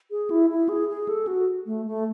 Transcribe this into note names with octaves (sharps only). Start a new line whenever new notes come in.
G#4
E4
E4
G#4
G#4
A4
F#4
A3
A3